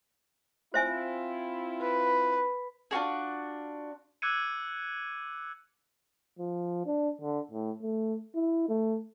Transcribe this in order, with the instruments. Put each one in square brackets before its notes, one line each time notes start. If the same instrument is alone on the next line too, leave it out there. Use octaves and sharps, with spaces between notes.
[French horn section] C4 E4 F4 [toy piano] C5 E5 G#5
[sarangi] B4
[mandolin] D4 F4 F#4 G#4
[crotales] D6 E6 F#6 G#6 C#7 D#7
[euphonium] F3
D4
D3
A2
A3
E4
A3